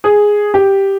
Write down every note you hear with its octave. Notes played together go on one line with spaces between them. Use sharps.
G#4
G4